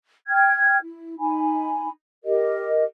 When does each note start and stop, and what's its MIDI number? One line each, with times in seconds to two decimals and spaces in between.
0.28 0.76 79
0.28 0.76 89
0.28 0.76 92
0.83 1.15 64
1.18 1.89 63
1.18 1.89 80
1.18 1.89 83
2.24 2.84 67
2.24 2.84 70
2.24 2.84 75